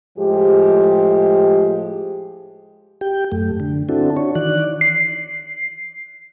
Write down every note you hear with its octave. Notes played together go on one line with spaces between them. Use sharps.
A2 F3 G#3 G4
G4 G5
F#2 A3
D3
C4 D4 E4 F#4 A4
D4 F#4 C#5
D#3 E3 D5 F#6
C7